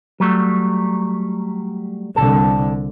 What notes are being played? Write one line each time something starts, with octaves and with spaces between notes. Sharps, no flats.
F#3 G3 A3
C2 D3 A4